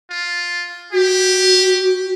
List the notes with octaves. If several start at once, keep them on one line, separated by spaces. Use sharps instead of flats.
F4
F#4 G4